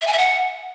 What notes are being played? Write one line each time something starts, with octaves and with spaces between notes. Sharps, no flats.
E5
G#5
E5
F#5